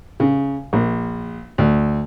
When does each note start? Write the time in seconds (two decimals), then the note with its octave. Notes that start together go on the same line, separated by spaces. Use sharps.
0.20 C#3
0.73 A#1
1.58 D2